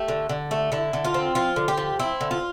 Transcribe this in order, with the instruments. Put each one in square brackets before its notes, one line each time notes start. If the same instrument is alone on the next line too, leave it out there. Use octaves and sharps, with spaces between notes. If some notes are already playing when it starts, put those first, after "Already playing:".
Already playing: [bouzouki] A3 G4
D3
D3
A3
D3 E4
D3
F4
C4
F3 F4
D3
G4
F3
C4 E4
D3
F4